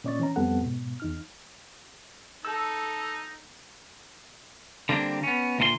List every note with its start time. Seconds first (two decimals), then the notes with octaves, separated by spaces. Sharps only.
0.04 A#2 C#4 D5 D#5 C#6 A6
0.19 E3 C#4 A#5
0.36 F2 G3 B3 C4 A4 F#5
0.61 G#2 B2
1.00 E2 D#4 F6
2.45 D#4 A4 E6
4.89 D3 G3 A#3 C4 D4
5.23 B3 C#4
5.59 D2 A#2 A4 C6